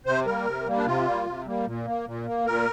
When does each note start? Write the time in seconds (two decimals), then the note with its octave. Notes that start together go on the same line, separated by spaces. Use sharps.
0.06 C3 C5
0.26 G3 A#3 A#4
0.46 C3
0.66 G3 A#3
0.77 D4
0.86 C3 F4
1.06 G3 A#3
1.26 C3
1.46 G3 A#3
1.66 A#2
1.85 A#3
2.06 A#2
2.26 A#3
2.46 A#2 A#4